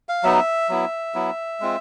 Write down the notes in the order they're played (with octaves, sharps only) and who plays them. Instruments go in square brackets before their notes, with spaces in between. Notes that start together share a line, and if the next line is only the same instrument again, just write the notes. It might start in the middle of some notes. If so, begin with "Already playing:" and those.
[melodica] F5
F#3 B3 D#4 E5
F#3 B3 E4
F#3 B3 E4
G#3 C4 F4